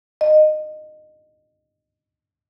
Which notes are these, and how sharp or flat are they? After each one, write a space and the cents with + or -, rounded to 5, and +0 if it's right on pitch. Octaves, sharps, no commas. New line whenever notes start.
D#5 -20